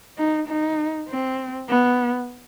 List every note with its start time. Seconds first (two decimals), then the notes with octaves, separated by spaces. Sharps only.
0.18 D#4
0.48 D#4
1.09 C4
1.69 B3